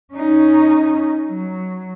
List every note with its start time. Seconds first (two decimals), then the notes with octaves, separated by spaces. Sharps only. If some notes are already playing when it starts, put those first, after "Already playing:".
0.14 C#4 D#4
1.26 F#3